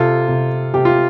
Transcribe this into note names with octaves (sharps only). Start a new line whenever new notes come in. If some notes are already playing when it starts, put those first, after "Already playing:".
Already playing: C3 F4 A4
C3
C3 G4
F4